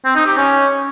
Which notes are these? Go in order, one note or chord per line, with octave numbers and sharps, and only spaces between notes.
C4
D#4
G4
C#4